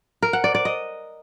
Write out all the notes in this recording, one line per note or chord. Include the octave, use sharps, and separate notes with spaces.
A#4
F#5
D5
D5
D#5